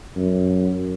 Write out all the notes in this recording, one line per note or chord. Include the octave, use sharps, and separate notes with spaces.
F#2